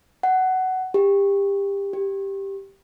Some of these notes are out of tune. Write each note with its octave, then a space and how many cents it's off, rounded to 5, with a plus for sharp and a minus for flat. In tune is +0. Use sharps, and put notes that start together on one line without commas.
F#5 +15
G4 +25
G4 +0